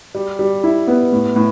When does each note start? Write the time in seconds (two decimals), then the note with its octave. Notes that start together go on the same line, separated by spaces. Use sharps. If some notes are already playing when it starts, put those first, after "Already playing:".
0.15 G3
0.39 G3
0.63 E4
0.87 B3
1.12 A2
1.36 A2